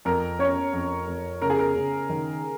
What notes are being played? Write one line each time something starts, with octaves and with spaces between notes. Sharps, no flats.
F2 A#4
C#4 C#5
F2
F2
C#3 A#4
G#4
A#4
C#3
D#3